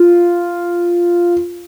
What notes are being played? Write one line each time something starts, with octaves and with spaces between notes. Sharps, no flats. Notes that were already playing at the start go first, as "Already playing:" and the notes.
Already playing: F4